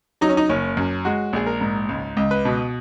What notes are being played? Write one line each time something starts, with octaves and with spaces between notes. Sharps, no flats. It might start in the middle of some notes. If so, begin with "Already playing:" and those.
F#3 D#4
C#4
D#4
F#1 C#4
F#2
G#3 F#4
A#1 G#4
A#4
G#2
C#2
C#2
B4
B2